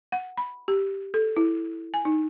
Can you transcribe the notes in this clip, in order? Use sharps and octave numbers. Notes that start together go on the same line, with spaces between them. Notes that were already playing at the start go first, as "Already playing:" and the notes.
F#5
B5
G4
A4
E4
G#5
D#4